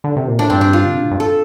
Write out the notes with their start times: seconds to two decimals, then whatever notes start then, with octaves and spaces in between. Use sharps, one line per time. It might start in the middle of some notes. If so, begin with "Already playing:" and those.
0.04 D3
0.16 C3
0.28 A#2
0.39 A2 D4
0.50 G2 C4
0.61 D4
0.73 F4
0.85 D3
0.94 C3
1.02 A2
1.11 G2
1.20 A4